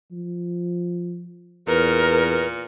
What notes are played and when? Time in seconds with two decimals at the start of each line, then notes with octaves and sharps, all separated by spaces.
0.12 F3
1.67 E2 A#2 A#4 B4